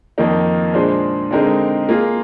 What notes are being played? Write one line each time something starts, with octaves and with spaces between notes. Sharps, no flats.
F2 D#3 A#3 D#4
A#2 G#3 D4 G#4 C5
D3 G#3 C4 D#4 A#4
A#3 F4 G#4